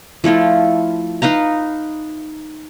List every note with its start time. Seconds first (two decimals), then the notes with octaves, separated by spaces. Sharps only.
0.24 F3 A3 E4 F4
1.22 D#4 B4 F5 A#5